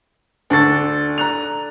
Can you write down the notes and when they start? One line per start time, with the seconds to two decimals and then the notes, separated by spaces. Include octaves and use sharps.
0.50 D2 D4 A4 C#6 A6
1.18 A#5 F#6 F7